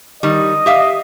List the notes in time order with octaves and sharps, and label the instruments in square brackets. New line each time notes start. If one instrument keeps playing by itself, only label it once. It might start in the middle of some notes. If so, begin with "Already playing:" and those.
[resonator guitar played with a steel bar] D#3 G3 [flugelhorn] D#5
[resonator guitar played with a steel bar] G4 E5 F5